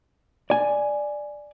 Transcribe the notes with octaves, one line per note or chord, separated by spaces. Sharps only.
D5 G#5